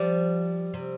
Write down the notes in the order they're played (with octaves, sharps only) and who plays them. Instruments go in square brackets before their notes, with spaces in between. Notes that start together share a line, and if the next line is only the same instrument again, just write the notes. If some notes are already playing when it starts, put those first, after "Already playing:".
Already playing: [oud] F3 [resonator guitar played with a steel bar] G3
[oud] C3